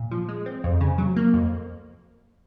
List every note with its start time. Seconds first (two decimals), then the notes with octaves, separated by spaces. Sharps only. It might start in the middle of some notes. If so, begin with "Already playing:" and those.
Already playing: A#2
0.11 F3
0.29 G#3
0.46 C4
0.64 F2
0.81 C#3
0.98 F#3
1.16 A#3
1.34 F2